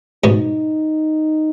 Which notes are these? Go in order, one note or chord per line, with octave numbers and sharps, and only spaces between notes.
G#2 B2 D#4